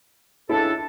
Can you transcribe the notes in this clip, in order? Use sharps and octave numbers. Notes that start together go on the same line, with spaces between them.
C#2 D4 E4 A4